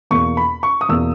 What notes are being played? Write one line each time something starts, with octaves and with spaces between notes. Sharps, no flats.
E2 B2 A#3 C#6
B5
C#6
D#6
E2 B2 A#3 E6